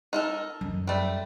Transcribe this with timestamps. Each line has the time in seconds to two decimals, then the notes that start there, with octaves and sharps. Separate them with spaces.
0.13 D#4 A4 A#4
0.61 F#2
0.87 G3 A3